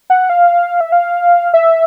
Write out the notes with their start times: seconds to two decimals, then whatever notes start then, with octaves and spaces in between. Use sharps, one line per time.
0.10 F#5
0.30 F5
0.81 E5
0.92 F5
1.54 E5